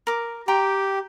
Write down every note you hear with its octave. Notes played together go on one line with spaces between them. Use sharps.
A#4 D6
G4 G5 A#5 C6